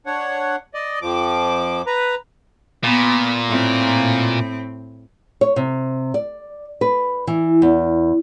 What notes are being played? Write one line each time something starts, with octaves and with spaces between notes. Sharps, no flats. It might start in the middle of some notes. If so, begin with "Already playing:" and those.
D4 C#5 F#5
D5 D#5
F2 F3 D6
B4 A#5
A#2 B3
A2 C4
C#5
C3
D5
B4
E3
E2